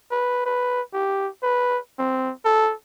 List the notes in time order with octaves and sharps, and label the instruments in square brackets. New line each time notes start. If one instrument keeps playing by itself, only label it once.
[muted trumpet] B4
B4
G4
B4
C4
A4